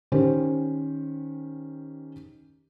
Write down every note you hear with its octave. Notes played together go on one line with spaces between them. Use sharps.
D#3 C#4 G4 C5